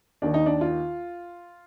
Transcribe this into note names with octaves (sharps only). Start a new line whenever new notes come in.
D#2 D#3 D4
D#4
D4
F4